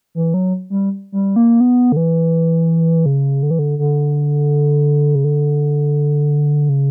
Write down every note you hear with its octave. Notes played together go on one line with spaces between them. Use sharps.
E3
F#3
G3
G3
A#3
B3
D3
E3
C#3
D3
E3
D3
D3
C#3
D3
C#3